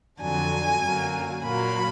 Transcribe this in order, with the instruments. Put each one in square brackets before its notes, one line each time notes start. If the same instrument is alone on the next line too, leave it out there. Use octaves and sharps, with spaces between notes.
[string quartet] F2 D3 F#3 D4 G#5
F#2 D3 F#3 A#3
A#2 F#3 A#3 B5